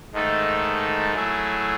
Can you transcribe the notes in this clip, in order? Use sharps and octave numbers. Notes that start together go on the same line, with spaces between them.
G#2 D#3 A3 D#4 A4
F#3 A3 E4 G#4